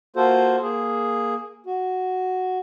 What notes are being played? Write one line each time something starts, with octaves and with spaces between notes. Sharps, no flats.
A#3 F4 F#4 A4 C5
A#3 G#4
F#4